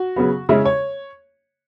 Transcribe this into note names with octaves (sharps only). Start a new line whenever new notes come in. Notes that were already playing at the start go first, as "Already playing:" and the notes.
Already playing: F#4
C#3 F#3 B3
C#3 G#3 C#4 E4
C#5